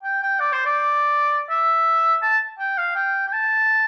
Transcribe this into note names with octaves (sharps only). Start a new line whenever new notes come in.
G5
G5
D5
C5
D5
E5
A5
G5
F5
G5
G5
A5